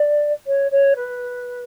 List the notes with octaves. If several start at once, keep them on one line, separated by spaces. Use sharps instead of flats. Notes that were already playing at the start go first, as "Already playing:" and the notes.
Already playing: D5
C#5
C#5
B4